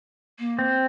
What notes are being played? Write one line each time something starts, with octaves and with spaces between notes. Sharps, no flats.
A#3
C4